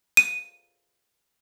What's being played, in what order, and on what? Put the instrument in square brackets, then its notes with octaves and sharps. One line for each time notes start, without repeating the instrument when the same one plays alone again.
[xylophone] D#7